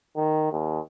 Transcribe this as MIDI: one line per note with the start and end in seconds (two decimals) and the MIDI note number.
0.16 0.50 51
0.52 0.79 39